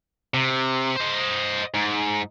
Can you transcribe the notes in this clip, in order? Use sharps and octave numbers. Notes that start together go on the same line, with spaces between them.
C3
C5 D#5
G#2